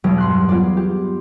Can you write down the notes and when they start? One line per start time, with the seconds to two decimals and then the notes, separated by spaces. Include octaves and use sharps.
0.04 B1 E2 F#3 G3 D7
0.18 G2 C6 F#6
0.49 B3 F4 G#4 D5
0.77 G4